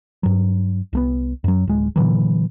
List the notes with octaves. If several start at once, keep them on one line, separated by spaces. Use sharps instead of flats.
G2 F#3
C2 A3 B3
F#2 F#3
D1 G#3
A#2 D3 E3 F#3